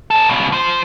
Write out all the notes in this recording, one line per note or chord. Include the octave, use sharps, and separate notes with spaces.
C#4 A4
C#2 B2
F3 C5